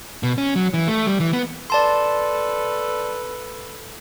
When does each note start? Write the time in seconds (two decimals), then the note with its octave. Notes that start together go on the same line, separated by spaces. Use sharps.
0.23 B2
0.38 C#4
0.56 F#3
0.74 E3
0.88 A3
1.06 G3
1.20 E3
1.33 B3
1.70 A4 B4 D5 A5 C6